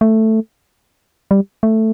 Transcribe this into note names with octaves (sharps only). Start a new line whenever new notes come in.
A3
G3
A3